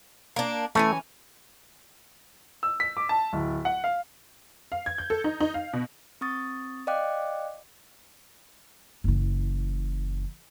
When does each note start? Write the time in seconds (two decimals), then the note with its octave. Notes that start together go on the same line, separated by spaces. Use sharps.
0.36 A#3 D4
0.75 E3 A3 C#4 G#5
2.63 E6
2.80 B6
2.97 D6
3.09 A5
3.33 D1
3.65 F#5
3.84 F5
4.72 F5
4.86 G#6
4.98 G6
5.10 A4
5.24 D#4
5.40 D#4
5.54 F5
5.73 B2
6.21 C4 C#6 D#6 A6
6.87 D5 D#5 F5 G5 D6 F#6
9.04 F#1 E3